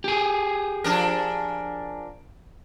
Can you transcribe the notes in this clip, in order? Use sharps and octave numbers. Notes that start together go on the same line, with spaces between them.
G4 G#4
F3 D4 A#4